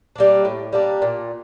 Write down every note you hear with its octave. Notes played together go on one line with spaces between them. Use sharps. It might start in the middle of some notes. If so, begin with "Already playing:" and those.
G3 A#3 D4
A2
G3 A#3 D4
A#2